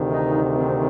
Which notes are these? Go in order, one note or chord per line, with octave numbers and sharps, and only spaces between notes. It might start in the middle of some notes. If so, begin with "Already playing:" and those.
Already playing: D2 C3 D#3
D#4
C4